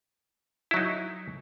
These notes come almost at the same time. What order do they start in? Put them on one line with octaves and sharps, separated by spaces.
E4 F#3 D#4